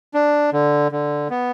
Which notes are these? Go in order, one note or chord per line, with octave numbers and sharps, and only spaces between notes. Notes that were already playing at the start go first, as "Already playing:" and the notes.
D4
D3
D3
B3